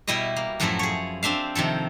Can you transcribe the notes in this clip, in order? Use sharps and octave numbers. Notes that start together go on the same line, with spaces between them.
B2 G3 E4 G4 D#5
A#3
F#2 A2 F3 F#3 A3 E4
G#4 C#5
C4 D4 E5 F5
C3 D#3 F3 A4